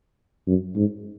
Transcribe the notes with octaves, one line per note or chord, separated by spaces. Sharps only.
F#2
G#2